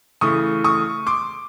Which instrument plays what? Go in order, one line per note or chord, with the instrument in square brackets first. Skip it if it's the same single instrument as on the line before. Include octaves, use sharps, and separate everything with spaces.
[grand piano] C#3 E3 A3 C#6 D#6
C#6 D#6
C6 D6